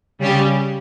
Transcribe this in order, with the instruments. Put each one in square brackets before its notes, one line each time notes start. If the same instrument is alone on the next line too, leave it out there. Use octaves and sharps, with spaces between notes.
[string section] C#3 G3 C#4 G4